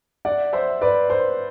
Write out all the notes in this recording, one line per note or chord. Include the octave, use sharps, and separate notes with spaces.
D5 F#5
C5 E5
B4 D5
C5